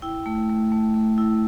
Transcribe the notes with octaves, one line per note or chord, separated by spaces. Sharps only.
E4 G5
A3
A3
A3
A3
E4